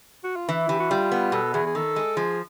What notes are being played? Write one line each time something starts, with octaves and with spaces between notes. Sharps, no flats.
F#4
F4
E3 E4
E3 G4
F#4
G3 F4
B3
B2 A4
E2 G#4
G#4
D#3 A4
G#3
F3 G#4